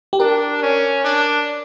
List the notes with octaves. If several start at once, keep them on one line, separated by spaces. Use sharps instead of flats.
G4
D4 A#4
C#4
D4